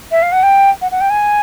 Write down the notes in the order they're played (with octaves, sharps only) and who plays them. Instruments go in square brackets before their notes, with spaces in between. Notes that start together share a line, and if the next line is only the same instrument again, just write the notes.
[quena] E5
F5
F#5
G5
F#5
F#5
G5
G#5